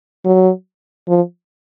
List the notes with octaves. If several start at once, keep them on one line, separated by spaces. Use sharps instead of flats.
F#3
F3